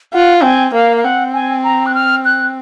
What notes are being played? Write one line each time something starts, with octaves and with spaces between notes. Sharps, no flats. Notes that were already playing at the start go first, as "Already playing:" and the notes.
F4 F#5
C4 G#5
A#3 F5
F5
C4 F#5
G#5
A#5
F#6
F6
F#6